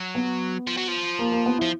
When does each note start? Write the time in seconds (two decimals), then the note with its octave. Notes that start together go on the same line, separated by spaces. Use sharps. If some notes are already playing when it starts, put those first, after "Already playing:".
Already playing: F#3
0.15 B3
0.67 F3
0.78 F#3
0.88 F3
1.19 A#3
1.32 A#3
1.46 B3
1.59 F3 E4